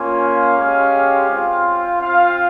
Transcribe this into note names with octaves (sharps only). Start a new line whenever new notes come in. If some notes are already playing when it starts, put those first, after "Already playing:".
Already playing: A#3 C#4 F4
F5
G#3 C#4 G4
C4 F4
C4 F4 F5